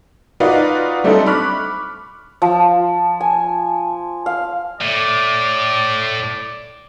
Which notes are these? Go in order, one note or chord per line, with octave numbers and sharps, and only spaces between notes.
D#4 F4 F#4 B4 D5 F5
G3 A3 C4 D4 D#4 A4
B5 C#6 D6 F6 F#6 B6
F3
G#5
F5
A2 D5